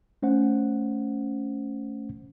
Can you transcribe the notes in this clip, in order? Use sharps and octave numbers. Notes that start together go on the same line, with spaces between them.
A3 C#4 C5 F#5